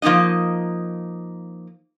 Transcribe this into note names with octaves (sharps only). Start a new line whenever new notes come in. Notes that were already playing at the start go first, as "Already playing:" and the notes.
F3 A#3 C#4 D#4 D#5